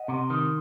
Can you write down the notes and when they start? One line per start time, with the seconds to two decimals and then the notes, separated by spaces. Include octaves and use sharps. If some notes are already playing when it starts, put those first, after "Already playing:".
Already playing: D#5 F#5
0.08 C3
0.30 D#3